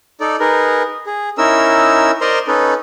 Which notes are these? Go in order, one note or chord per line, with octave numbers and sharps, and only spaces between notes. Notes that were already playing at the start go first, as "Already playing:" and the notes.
D#4 A4 D5
D#4 G#4 A#4 B4
G#4
C#4 D#4 E4 A#4 E6
A#4 C5 D5 D#5 A#5 C6
C#4 D#4 A4 B4